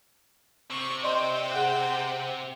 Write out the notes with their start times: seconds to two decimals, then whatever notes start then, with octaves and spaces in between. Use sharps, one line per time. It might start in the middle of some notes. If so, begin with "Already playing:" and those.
0.70 C3 C#6
1.04 C5 D5 D#5 G5 C6
1.52 G#4 F#5 F#6